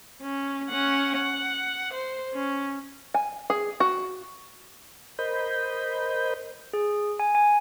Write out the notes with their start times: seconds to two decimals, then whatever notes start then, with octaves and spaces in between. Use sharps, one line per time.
0.22 C#4
0.69 C#4 F#5
1.15 F#5
1.93 C5
2.34 C#4
3.14 G#5
3.50 G#4
3.80 F#4
5.19 A#4 C5 D#5 B5 G6
6.73 G#4
7.20 G#5
7.35 G#5